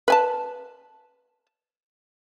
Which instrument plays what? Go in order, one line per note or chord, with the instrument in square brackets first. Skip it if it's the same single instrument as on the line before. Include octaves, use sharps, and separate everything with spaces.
[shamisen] B4 G#5 A5